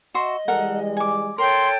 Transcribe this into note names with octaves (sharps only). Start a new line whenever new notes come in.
F#4 D#5 E5 C6
E3 G3 G#3 A4 A#4 F#5
G#5 D6
A4 A#4 C#5 G5 C6